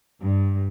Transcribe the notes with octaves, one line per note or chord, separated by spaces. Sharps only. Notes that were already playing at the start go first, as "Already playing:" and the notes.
G2